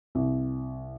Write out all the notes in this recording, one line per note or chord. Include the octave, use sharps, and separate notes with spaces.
C2